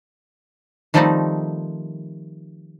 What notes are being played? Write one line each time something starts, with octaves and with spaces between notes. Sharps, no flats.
D#3 F3 G3 A3 C4 D#4